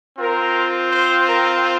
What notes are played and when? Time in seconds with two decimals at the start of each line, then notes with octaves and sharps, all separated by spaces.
0.19 C4 F4 A#4
0.91 C5
1.27 A#4